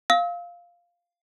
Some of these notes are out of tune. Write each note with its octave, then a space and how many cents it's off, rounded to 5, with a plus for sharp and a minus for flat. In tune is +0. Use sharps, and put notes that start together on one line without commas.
F5 +0 E6 -40